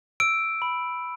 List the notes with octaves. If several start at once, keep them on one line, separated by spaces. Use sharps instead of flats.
E6 D7
B5